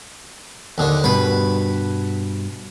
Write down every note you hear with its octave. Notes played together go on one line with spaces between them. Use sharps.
D#2 D3
G2 B2 B4